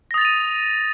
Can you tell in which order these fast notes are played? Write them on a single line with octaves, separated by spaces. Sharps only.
A#6 D#6 A6 F7 D#7